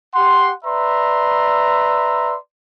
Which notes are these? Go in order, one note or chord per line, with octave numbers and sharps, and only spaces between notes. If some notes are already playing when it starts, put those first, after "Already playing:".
G4 F#5 C6
B4 D5 E5 A#5 C6